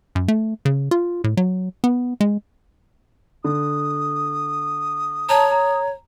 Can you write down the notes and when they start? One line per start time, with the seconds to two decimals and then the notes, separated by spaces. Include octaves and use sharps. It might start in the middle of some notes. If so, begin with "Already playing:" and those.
0.15 F#2
0.28 A3
0.65 C#3
0.91 F4
1.24 A2
1.37 F#3
1.84 B3
2.21 G#3
3.44 D3 D#6
5.29 C#5 A5 A#5
5.51 A#5